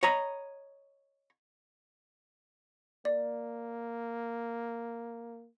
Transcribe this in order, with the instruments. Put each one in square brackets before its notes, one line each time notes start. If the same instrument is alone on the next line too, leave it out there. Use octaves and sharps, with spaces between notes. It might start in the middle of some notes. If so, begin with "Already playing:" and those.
[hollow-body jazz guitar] C#5 D#5 A#5 B5
[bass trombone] A#3 [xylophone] D5